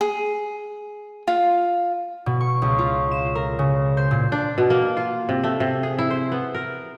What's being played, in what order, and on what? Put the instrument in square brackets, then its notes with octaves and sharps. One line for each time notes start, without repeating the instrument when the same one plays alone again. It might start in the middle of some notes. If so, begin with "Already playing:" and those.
[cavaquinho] G#4
F4
[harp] B2
C#6
C#2
F4
E7
A#4
C#3
C5
A#2
[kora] D4
B2
A#3
F4
C3
A3
C3
G#4
E4
C5
B3
A#4